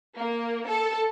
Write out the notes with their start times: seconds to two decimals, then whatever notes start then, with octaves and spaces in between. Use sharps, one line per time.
0.17 A#3
0.68 A4